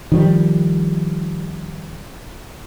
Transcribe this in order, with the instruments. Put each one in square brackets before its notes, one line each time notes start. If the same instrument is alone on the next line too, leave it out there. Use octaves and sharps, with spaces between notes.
[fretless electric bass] D#3 F3 G3